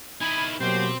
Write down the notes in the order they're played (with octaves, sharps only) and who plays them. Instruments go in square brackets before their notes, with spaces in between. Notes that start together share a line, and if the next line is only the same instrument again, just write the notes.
[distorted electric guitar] D#3 E4 [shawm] G#5 [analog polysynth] B5
[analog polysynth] B2 [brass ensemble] F#3 A#3 G4 [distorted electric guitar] C4 [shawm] C5